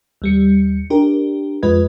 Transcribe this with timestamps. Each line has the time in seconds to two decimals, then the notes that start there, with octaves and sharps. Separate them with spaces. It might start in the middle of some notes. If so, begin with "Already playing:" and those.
0.22 D#2 G3 C#7
0.90 D4 G4 A#4
1.63 F2 G#3 F4 B4 D#5 G#6